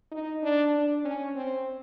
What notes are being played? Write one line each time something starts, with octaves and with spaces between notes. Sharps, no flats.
D#4
D4
D4
C#4
C4